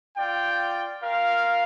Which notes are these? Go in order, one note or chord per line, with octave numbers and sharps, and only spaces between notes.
F4 D5 G5
F4 A#4 F5